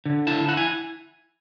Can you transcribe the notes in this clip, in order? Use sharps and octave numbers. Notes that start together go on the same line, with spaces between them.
D3
E4 A5
E4 F#5
G#5